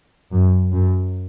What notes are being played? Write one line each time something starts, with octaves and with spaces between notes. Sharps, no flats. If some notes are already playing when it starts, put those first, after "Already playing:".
F#2
F#2